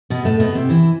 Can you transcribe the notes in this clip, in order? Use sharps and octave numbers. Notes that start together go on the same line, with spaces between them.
B2 B3
A2 A3
B2 B3
C3 C4
E3 E4